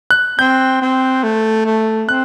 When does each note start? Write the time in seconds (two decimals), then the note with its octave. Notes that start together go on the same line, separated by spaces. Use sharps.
0.11 F#6
0.39 C4 G6
0.81 C4
1.23 A3
1.65 A3
2.09 C4 F#6